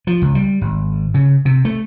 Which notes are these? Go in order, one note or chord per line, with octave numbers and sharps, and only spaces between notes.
F3
C#2
G3
G#1
C#3
C3
A3